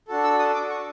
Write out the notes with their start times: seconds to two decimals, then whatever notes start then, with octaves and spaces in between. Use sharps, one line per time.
0.08 D4 F#4 A4
0.24 E6
0.39 D#6
0.54 D6
0.70 C#6